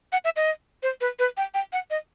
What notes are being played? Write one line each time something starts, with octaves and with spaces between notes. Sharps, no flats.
F#5
E5
D#5
C5
B4
B4
G5
G5
F#5
D#5